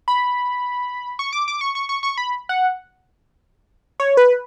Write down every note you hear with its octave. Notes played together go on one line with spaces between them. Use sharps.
B5
C#6
D6
D6
C#6
C#6
C#6
C#6
B5
F#5
C#5
B4